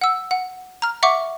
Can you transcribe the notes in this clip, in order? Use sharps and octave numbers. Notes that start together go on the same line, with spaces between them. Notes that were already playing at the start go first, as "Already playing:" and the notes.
F#5 E6
F#5
A#5 F6
E5 F#5 C#6 D6